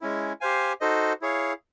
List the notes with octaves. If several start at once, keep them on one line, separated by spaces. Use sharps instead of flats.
G#3 C#4 E4
G4 C5 F5 G#5
D#4 F#4 A4 C5 D#5
E4 G#4 C#5 F5